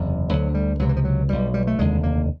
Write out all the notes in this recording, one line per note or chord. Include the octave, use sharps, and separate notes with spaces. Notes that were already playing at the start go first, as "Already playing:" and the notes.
Already playing: F#1 E2 C3
D2 D3 F#3
G3
C#2 C3 F#3
E3
F3
F#3
B1 B2 G3
G3
A3
F1 D#2 D3 G#3
A#3